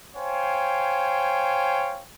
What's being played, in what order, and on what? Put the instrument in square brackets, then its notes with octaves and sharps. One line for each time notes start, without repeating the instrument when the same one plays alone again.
[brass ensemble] C5 C#5 F5 G5 G#5